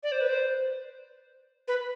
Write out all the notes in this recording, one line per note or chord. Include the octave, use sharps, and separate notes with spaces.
D5
C5
B4
C5
B4